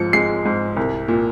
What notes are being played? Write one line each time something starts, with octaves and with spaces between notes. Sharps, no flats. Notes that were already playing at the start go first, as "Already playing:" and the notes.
Already playing: G#2 F3 C#7
G#3 C7
G#2
C2
A#2